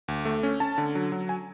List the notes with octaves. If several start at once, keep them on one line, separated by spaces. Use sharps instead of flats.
D2
A3
C#4
C#4 A5
D3
F#3
F#3
G#5